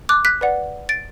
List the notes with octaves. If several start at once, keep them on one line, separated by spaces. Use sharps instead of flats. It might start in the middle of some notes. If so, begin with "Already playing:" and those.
D6 F#6
F#6 B6
B4 D5 F#5
A6 D7